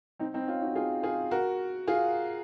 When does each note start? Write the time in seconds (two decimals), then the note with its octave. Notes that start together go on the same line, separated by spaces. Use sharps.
0.19 C4 D#4
0.34 C4 D#4
0.47 C#4 F4
0.62 D#4 F#4
0.75 F4 G#4
1.03 F4 G#4
1.31 F#4 A#4
1.87 F4 G#4